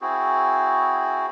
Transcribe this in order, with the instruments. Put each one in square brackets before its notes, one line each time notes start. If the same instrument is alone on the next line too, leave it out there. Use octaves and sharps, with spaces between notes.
[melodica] C4 E4 F#4 G#4